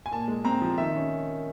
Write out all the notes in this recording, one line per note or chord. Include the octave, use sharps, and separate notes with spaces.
G#5
A#2 A5
G#3
C4 A#5
F3
D#3 E5
C#4